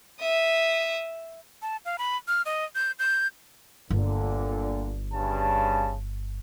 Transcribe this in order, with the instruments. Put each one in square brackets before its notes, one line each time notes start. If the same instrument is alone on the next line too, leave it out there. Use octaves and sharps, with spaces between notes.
[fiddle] E5 D#6
[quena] A5
F5
B5
F6
D#5
G6
G6
[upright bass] G1 [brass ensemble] A#2 D3
[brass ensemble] G2 C#3 A5